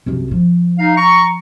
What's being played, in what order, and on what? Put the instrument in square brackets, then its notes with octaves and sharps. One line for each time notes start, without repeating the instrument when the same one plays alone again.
[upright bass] C2 F#2
F3
[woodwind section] D#4 F5
A#5 C#6